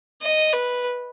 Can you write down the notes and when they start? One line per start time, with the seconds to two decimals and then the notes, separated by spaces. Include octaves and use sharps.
0.22 D#5
0.53 B4